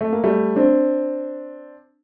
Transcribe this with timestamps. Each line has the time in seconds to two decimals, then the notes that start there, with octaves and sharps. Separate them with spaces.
0.01 A3
0.13 A#3
0.24 G3 A3
0.56 C4 D4